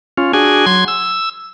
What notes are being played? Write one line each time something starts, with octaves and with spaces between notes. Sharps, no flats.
C#4 F4
D4 F#4 G#4 G#5
F#3 C6 G#6
E6